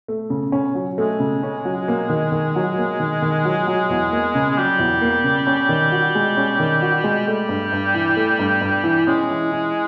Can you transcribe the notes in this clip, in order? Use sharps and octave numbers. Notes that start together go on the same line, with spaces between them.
A3
C#3
C#4
F#3
G#3 A3
C#3
C#4
F#3
A#3
D#3
D#3
F#3
A#3
D#3
D#3
F#3
F#3
E2
A#3
C#3
G#3
F#3 G3
E2
A#3
C#3
C#4
D#3
F#4
G#3
C#4
D#3
F#4
G#3
G3 A3
G2
G2
E3
A3
G2
G2
E3
G#3 C#4
E3
E3